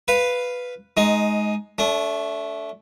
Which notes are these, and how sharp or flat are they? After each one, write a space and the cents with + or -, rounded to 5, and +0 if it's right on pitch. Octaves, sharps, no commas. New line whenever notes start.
B4 +0 F5 +0
G#3 +20 D#4 +0
A3 +0 D4 -35